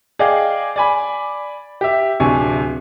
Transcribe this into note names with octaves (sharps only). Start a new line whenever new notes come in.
G#4 D5 D#5 F5 G5
D5 G#5 B5
G4 E5
D1 C3 D4 G#5 C#6